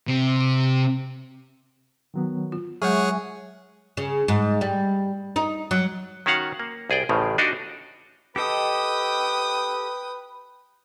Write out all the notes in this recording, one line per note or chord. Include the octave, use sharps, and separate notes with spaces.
C3
D#3 F#3 B3
F4
F#3 G#3 G#4 C#5 E5 F#5 G#5 C#6
C#3
G#2
G3
D#4
F#3
D#3 C#4 F#4 F5 F#5
A#3
C2 G#4 D5 G5
A1 A2 C#3 F3
D4 D#4 F#4 D5 D#5 F5
G4 A4 B4 D#5 G5 D#6